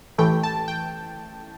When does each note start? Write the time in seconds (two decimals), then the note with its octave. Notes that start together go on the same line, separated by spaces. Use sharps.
0.18 A1 A2 E3 A3 G5
0.43 A5
0.68 G5